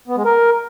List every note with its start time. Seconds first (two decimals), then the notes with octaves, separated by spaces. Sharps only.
0.08 B3
0.17 G#3
0.25 A#4